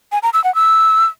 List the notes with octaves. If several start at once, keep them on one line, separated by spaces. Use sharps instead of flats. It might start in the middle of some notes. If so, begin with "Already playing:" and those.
G#5
A#5
E6
F#5
E6